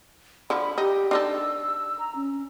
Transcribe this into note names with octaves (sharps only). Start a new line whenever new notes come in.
D3 F3 B5
D#4 G4
D4 D#4 A4 E6
A#5
C#4